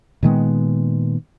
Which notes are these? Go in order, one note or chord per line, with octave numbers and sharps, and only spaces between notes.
A#2 D#3 G#3 B3